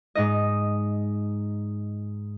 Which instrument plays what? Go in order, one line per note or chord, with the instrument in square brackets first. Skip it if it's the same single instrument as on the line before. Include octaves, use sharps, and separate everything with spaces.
[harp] G#2 D#4 D#5